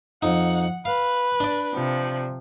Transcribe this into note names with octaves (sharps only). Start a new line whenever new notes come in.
F2 D#4 F#5
B4 F5
D4 D5
C3 F3